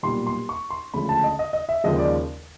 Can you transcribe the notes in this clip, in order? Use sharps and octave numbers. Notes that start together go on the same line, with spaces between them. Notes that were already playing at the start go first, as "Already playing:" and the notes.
B1 A#2 G3 C6
C6
C#6
C6
D2 C#3 F3 G#3 B5
A5
D#5
D#5
D#5
E5
D#2 C#3 F3 G#3 D#5
D5